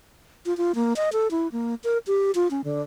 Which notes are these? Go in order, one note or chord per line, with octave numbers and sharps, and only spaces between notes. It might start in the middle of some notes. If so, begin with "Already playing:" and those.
F4
F4
A#3
D#5
A4
E4
A#3
A#4
G4
F4
C#4
D3